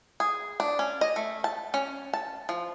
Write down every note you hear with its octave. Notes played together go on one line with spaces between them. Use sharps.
G#4
D4
C#4
D#5
A3
A5
C#4
A5
F3